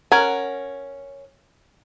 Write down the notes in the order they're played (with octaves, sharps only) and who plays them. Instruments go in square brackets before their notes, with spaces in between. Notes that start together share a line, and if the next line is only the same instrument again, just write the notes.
[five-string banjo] C#4 A#4 F#5 G#5